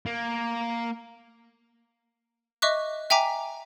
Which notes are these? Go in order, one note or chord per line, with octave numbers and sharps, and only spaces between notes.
A#3
D#5 E5 C#6 D6 F#6
E5 G5 G#5 A#5 D6 B6